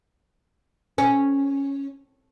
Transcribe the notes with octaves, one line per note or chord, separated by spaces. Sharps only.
C#4